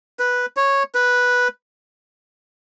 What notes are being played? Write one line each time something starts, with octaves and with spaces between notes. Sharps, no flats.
B4
C#5
B4